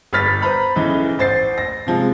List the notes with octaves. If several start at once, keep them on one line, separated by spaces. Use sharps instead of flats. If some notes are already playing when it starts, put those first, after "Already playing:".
G1 B4 F6 A6 B6
B4 C5 A#5 B5
B1 C#3 E3
A1 C5 A6 C7
A#6
C3 F3 G#3